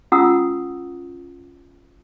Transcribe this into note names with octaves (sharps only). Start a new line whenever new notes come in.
C#4 F4 F#5 A#5 D#6 E6